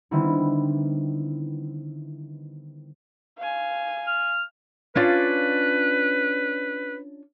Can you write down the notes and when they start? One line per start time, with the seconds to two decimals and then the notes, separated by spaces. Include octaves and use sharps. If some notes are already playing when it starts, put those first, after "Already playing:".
0.11 D3 D#3 G3 B3 C4 E4
3.39 F5 G#5
4.07 F6
4.95 C#4 D4 F4 B4